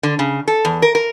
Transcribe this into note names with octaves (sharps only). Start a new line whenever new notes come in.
D3
C#3
A4
E2
A#4
A#4